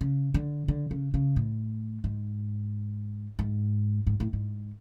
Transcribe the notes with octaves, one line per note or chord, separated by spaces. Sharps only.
C#3
D3
D3
C#3
C#3
A2
G#2
G#2
G#2
A2
G#2